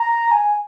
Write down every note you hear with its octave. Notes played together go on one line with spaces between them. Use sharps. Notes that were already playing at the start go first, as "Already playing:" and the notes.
Already playing: A#5
G#5